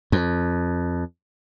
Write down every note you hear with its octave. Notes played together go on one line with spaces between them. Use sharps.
F2